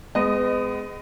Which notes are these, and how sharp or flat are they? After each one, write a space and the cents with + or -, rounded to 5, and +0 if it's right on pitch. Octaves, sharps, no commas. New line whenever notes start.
G#3 +0 B3 +40 D#5 -10